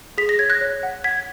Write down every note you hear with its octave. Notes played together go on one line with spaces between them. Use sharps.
G#4 B6
A#6
C#5 G#6
F#6 A#6
C#5
F#5
F#5 G#6 B6